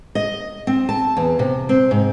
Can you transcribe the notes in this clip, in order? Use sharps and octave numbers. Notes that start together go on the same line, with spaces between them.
D#5
C4
A5
E2
C3
C4
G#2